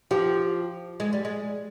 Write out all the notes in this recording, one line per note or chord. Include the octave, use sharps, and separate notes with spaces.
F3 G4
G#3
G3
G#3